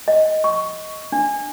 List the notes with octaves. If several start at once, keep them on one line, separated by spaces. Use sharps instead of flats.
D#5
C#6
D4